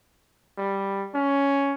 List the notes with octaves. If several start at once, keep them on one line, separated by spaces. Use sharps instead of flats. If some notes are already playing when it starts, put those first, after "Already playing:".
G3
C#4